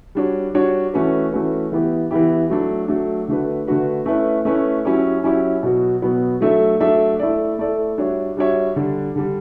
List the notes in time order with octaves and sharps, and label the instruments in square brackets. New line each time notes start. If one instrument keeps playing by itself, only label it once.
[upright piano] G3 D4 F#4 C#5
G3 D4 F#4 C#5
E3 A3 C#4 F#4 B4
E3 A3 C#4 F#4 B4
E3 B3 E4 G4
E3 B3 E4 G4
F#3 A3 D4
F#3 A3 D4
D3 A3 D4 F#4 B4
D3 A3 D4 F#4 B4
A3 C#4 E4 B4
A3 C#4 E4 B4
F#3 C#4 E4 G4 C#5
F#3 C#4 E4 G4 C#5
B2 F#3 B3 F#4
B2 F#3 B3 F#4
F#3 A3 D4 A4 E5
F#3 A3 D4 A4 E5
A3 E4 A4 D5
A3 E4 A4 D5
G3 D4 F#4 C#5 E5
G3 D4 F#4 C#5 E5
D3 G3 D4
D3 G3 D4